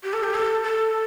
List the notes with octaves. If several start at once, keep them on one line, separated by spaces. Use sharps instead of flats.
G4
A4
G4
A4
A4